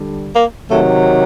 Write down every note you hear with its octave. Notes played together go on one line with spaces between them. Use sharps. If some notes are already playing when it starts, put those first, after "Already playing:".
Already playing: D3 G3
A#3
C3 D#3 F#3 A3